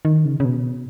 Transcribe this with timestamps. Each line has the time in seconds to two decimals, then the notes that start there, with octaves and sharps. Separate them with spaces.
0.05 D#3
0.25 C#3
0.40 C#3
0.45 B2